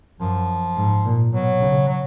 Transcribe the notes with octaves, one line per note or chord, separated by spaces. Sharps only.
F#2 F3
G#2
A#2
B2 F#3
C#3
F#3